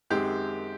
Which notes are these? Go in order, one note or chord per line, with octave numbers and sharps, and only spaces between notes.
F#2 D#3 G#3 C4 G4